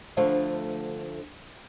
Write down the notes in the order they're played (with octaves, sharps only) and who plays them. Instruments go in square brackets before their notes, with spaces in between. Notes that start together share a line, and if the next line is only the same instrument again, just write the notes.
[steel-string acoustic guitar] D2 D3 F3 A3